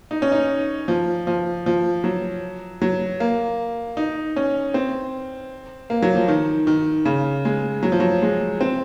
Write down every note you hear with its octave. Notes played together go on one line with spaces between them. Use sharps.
D#4
C#4
D#4
F3
F3
F3
F#3
F#3
A#3
D#4
C#4
C4
A#3
F#3
F3
D#3
D#3
C#3
G#3
F#3
F3
F#3
G#3
C4